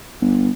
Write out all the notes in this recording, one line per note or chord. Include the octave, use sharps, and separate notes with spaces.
G1